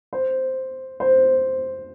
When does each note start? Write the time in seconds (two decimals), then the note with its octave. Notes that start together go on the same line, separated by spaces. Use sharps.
0.13 C5
1.00 C5